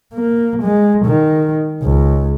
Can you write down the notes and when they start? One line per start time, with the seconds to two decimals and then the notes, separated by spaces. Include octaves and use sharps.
0.14 A#3
0.63 G#3
1.05 D#3
1.83 C#2